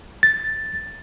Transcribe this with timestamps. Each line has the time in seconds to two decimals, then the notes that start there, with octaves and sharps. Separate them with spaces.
0.23 A6